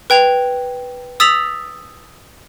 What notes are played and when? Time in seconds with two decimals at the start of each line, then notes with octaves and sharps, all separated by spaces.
0.10 B4 G5 G#6 F7
1.20 D#6 E6 A6 B6 F7 F#7